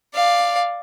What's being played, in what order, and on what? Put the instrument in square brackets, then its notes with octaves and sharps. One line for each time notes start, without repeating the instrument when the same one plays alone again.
[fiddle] D5 F5